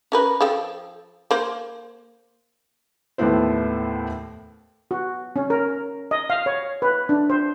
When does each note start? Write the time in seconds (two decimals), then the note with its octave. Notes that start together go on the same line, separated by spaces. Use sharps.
0.12 C#4 A#4 B4
0.41 F3 A4 G5
1.31 A#3 C5
3.18 D#2 A2 A3 B3 E4 C5
4.91 F#4
5.36 C#4
5.50 A#4
6.11 D#5
6.30 F5
6.46 C#5
6.82 B4
7.09 D4
7.30 C5